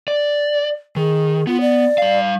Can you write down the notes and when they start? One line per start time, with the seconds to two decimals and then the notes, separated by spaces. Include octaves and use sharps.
0.08 D5
0.96 D#3 G#4
1.47 B3 F4
1.61 D5
1.98 G3 F5